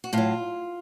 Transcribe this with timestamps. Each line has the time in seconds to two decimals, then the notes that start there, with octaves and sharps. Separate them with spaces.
0.04 F#4
0.13 A2 F#3 F4